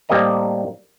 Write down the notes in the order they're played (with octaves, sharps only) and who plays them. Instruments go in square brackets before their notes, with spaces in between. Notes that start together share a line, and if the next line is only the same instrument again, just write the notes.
[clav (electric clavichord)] A2 G3 A#3 C4 D#5 A#5